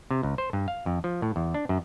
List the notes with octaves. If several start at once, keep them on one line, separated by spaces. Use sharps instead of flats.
C3
C#2
C5
G2
F5
F2
F3
A2
E2
D4
F#2